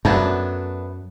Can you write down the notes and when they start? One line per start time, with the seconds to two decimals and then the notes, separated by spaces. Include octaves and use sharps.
0.05 F#2 A3 B3 D4